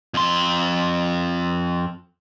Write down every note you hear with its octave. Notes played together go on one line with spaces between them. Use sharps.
F2 C6